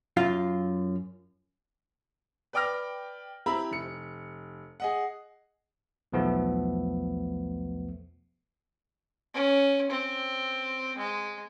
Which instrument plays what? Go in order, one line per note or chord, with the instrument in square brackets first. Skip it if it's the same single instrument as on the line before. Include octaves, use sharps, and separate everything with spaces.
[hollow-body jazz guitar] F#2 F4 F5
[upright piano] B4 D5 G5 D6 F6 A#6
C4 E4 G4 E5 A#5 B5
F1 C#7
G#4 D#5 F#5
[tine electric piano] B1 E2 F3 A3 B3
[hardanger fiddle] C#4
C4
G#3